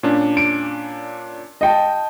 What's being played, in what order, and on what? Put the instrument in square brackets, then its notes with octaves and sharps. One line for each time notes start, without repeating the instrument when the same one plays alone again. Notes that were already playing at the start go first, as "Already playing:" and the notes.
[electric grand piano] A#2 C#4 D4
[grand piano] D7
D#5 G5 A5